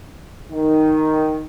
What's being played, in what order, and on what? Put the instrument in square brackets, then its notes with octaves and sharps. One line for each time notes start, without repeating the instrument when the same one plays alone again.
[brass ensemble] D#3